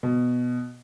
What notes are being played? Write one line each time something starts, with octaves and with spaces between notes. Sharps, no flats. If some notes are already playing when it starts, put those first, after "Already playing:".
B2